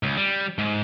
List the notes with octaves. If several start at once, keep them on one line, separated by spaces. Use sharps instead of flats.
C#2
G3
G#2